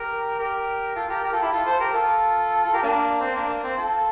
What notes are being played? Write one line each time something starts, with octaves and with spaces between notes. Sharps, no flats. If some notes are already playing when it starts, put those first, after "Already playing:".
Already playing: G4 A#4
G4 A#4
F4 A4
G4 A#4
G4 A#4
F4 A4
E4 G4
F4 A4
A4 C5
G4 A#4
F4 A4
F4 A4
G4 A#4
A#3 D4
C4
A#3 D4
A#3
C4
F4 A4